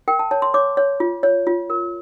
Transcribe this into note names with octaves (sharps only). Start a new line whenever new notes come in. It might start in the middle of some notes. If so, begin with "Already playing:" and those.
A#4 G5
A5
C#5 A5
C6
C#5 D6
C#5
F4
C#5
F4
A#4